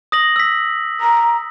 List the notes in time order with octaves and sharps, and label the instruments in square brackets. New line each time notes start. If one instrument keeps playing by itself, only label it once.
[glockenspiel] D#6 A#6 F#7
E6 B6
[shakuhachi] A#5